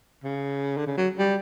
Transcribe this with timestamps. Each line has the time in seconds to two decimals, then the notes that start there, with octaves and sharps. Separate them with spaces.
0.24 C#3
0.77 D3
0.87 C#3
0.97 F#3
1.18 G3